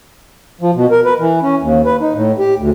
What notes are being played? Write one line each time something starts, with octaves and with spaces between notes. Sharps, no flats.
F3
B2
A#4
B4
E3
C#4
D#2
B4
D#4
A2
G4
D2